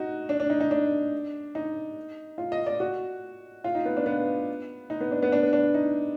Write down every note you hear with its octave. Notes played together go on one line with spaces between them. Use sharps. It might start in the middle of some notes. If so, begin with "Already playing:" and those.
Already playing: D#4 F#4
D4
D4
D#4
D#4
D4
D#4
F4
D#5
D5
F#4
F4
D#4
B3
D4
B3
D#4
B3
D4
B3
D4
B3
D4
D#4